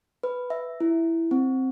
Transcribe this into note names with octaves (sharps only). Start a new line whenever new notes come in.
B4
E5
E4
C4